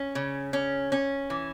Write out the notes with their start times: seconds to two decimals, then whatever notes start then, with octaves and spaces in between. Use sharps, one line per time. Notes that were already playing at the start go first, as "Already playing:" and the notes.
Already playing: C#4
0.15 C#3
0.53 C#4
0.92 C#4
1.30 E3